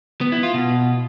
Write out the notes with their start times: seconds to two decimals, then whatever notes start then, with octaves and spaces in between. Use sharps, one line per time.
0.21 B3
0.32 E4
0.43 F4
0.54 B2